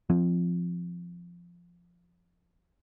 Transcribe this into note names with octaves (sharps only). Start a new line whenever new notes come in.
F3 C4